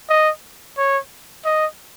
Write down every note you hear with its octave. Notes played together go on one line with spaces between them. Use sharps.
D#5
C#5
D#5